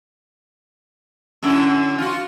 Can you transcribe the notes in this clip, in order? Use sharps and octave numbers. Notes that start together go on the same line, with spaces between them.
F#2 D3 E4
F4 F#4